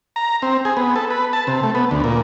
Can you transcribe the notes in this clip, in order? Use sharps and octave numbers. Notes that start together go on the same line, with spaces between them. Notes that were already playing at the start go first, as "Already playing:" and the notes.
A#5
C4
G#4
B3
A4
B4
A5
C3
A3
B3
D2
A#2